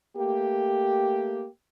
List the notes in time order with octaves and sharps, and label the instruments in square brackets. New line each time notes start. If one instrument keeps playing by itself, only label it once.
[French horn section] A3 A#3 G4